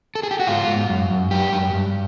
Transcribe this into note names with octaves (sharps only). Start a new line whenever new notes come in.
A4
G#4
G4
F#4
G#2 F4
G#2
F#2
F#2
F#2 G4
F#2
G2